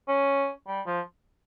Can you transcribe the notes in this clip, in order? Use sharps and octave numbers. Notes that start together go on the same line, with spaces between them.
C#4
G3
F3